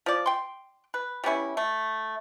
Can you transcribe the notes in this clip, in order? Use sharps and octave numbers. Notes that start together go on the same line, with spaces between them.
F3 D5
G5 C6
B4
G3 B3 C#4 E4
A3